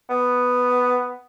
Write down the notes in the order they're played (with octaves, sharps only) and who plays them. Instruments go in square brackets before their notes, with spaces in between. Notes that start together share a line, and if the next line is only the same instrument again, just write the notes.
[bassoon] B3